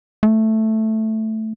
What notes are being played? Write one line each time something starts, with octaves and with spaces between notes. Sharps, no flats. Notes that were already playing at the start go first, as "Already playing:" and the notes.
A3